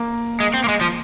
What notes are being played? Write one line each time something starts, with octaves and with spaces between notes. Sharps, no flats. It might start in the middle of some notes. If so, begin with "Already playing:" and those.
Already playing: A#3
G#3
C4
A#3
G#3
F3